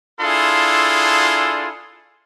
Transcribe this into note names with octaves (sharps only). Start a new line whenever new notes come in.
D4 E4 F4 G#4 A4 C6